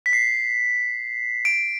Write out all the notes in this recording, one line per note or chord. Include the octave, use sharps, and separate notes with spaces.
B6
C7
D7